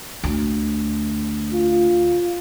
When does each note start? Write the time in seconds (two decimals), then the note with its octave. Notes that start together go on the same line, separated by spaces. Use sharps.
0.24 D2
1.53 F4